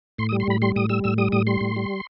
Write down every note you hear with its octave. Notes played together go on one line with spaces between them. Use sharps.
A2 C6
D#6
G3
C6
A2 B5
G3 C6
A2 D#6
G3 E6
A2 E6
G3 D#6
A2 D#6
G3 C6
A2
G3